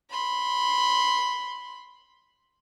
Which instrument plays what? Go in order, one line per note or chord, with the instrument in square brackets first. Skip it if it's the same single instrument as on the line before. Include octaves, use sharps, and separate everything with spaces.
[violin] B5 C6